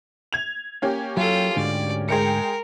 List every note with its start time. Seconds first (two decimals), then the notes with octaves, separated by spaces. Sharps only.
0.33 G#6 F7
0.82 A#3 C#4 G4
1.17 F#3 F4 A4
1.56 D2 G#2 D3 D5
2.09 G#3 A#4 G5 C#7